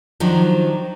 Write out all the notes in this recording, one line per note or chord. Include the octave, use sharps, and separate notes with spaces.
D#3 F3 F#3 D4